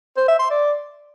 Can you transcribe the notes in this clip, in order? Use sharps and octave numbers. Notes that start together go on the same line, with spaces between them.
C5
E5
C6
D5